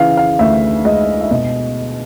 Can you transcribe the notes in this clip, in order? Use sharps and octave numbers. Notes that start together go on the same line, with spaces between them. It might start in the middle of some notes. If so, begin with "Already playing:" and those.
Already playing: C#3 E3 F5
F5
D2 E5
G#3 D#5
E5
B2 D#5